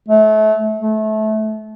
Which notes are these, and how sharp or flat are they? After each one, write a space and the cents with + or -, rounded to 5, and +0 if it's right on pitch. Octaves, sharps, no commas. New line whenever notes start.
A3 -30
A3 -25